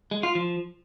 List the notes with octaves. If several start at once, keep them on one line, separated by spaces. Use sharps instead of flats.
G#3
F4
F3